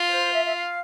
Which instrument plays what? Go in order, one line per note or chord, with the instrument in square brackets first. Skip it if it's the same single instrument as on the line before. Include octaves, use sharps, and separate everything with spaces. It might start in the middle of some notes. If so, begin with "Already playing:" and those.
Already playing: [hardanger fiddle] F4
[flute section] C5
E5
E5
F5